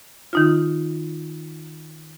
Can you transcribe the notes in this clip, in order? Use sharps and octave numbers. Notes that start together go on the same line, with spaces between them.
D#3 D#4 F4